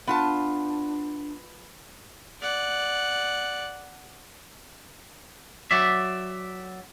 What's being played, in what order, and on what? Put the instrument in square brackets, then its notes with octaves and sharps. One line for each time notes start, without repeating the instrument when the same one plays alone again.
[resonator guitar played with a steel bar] B3 F4 A5 [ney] D4
[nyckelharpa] D5 F#5
[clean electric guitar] F#3 D5 E5